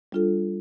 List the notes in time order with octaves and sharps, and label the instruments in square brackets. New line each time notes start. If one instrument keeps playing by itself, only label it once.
[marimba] G3 D4 F4 A4